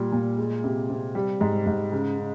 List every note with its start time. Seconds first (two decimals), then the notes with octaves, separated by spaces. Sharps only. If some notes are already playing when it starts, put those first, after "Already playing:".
Already playing: A#2 G3
0.12 A#2
0.37 G#3
0.64 C3
0.90 C3
1.15 G3
1.41 G#2
1.66 G#2
1.92 C#3
2.18 C#3